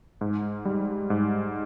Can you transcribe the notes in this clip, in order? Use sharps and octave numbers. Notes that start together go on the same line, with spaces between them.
G#2
G3
G#2